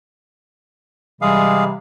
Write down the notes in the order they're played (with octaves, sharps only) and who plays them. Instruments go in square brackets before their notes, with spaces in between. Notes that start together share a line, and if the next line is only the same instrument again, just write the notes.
[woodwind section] C3 E3 G3 [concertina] G#3 G#4 F5